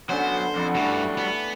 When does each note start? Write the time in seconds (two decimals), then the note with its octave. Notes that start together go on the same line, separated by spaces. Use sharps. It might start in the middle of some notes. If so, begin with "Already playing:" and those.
0.09 D3 F#3 B3 C#4 C5 F#5
0.55 F2 D5 F#5 B5
0.75 G2 E3 G3 A3 D4 F#4
1.18 B3